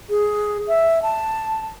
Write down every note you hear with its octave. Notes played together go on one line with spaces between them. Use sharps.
G#4
E5
A5